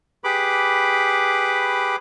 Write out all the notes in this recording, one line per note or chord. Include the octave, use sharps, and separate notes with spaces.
G4 G#4 B4 B5 D6